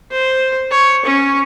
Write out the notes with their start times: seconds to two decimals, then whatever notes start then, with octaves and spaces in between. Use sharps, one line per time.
0.11 C5
0.71 C#5
1.06 C#4